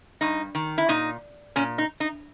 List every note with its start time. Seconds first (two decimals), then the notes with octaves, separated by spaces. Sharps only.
0.21 G2 D#4
0.55 D#3
0.78 E4
0.89 A#2 D#4
1.56 A#2 C#4
1.78 D#4
2.00 D#4